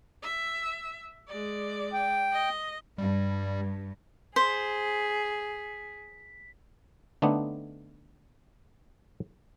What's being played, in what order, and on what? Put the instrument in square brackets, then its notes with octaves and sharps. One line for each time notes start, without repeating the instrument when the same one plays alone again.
[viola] E5
G#3 D5
[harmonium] G5
[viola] D#5
[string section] G2 [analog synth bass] G3
[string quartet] G#4 [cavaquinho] C5 [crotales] B6
[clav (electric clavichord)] D3 A3 B3 C4 D4 D#4